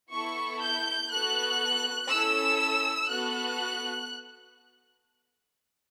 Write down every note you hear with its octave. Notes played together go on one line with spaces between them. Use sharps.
B3 E4 A4 C#6
G6
B3 F#4 A4 F#6
C#4 E4 A4 E6
B3 F#4 A4 F#6